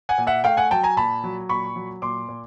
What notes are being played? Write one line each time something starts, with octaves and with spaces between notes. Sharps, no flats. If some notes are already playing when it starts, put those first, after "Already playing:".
F#5 G#5
A#2
E5 F#5
A3 F5 G5
F#5 G#5
F#3 G5 A5
G#5 A#5
A#2 A5 B5
F#3
A#2 B5 C#6
F#3
A#2 C6 D6
A#2